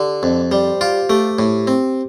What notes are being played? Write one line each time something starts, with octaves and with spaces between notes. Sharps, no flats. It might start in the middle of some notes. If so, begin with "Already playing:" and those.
Already playing: D3 G4 A4
F2
G3 C5
F4 G4
A3 G4
A2
C4